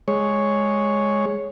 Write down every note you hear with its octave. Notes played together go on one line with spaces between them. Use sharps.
G#3 C#5